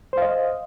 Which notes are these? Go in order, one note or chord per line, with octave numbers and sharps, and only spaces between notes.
C5 D#5 F5